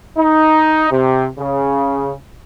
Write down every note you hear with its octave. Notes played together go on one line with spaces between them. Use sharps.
D#4
C3
C#3